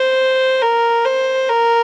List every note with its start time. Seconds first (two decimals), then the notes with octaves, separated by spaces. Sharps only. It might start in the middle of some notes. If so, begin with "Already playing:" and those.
Already playing: C5
0.62 A#4
1.05 C5
1.49 A#4